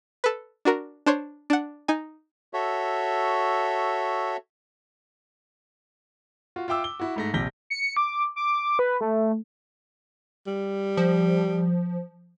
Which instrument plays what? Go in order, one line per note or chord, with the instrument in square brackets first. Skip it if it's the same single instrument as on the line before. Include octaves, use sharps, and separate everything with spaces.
[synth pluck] A4 B4
D4 F#4 A#4
D4 C5 C#5
D4 F#5
D#4 G#5
[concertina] F#4 A4 C#5 E5
[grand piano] F4 F#4
F4 E5 G5 D6 E6
G7
E4 F#4
G#2 A3 A#6
A#1 C3 G6 A#6 B6 G7
[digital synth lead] C#7
D6
D6
B4
A3
[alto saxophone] G3
[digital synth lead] F3